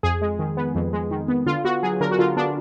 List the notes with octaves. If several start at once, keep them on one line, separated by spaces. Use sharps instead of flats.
F2 G#4
G#3
D#3
B3
F2
G#3
D#3
B3
D3 F4
B3 F#4
F#3 G#4
D3 A#4
F#4
D3 F4
B3 D4